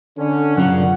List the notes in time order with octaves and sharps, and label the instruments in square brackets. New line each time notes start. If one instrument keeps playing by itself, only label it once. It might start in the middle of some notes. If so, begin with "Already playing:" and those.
[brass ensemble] D3 C#4
[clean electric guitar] F#2 C#3 F4 [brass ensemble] A#4 D5 F#5